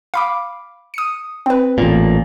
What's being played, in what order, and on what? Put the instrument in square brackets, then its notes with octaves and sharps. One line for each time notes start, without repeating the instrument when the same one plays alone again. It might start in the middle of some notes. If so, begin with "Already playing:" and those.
[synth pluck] F5 B5 D6
D#6 C#7
C4 B4
[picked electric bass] A1 A#2